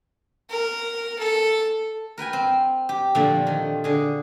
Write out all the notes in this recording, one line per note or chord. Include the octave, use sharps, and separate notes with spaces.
A#4
A4
A#4 B4 G5 G#5
C4
G4
A#2 D3 F3 A3 A#3
D#3
D3 G#4